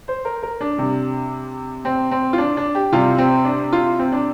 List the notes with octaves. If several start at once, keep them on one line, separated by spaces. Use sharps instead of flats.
C5
A#4
A#4
D4
C3 G3
C4
C4
F4
D4
D4
G4
C3 G3 F4
C4
D4
F4
C4
D4